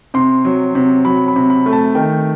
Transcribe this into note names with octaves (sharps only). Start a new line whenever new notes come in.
C3 C6
F#3
C3
F#3 B5
B5
C3
B5
A3
A5
D#3 G5